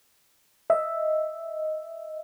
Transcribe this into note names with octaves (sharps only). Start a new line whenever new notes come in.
D#5 E5